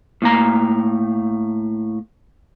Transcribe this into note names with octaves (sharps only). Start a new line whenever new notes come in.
A2 A#3 A#5